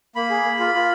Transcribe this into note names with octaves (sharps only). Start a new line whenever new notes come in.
A#3 B5
G#4
A#3
F4
F4